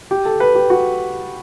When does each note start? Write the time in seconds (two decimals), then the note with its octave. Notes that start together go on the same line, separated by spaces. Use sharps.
0.11 G4
0.25 A4
0.40 B4
0.55 G4
0.70 F#4